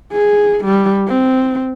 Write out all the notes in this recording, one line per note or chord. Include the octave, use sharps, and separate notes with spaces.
G#4
G3
C4